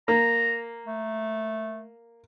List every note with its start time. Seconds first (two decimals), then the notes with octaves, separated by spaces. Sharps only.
0.08 A#3 A#5
0.86 A3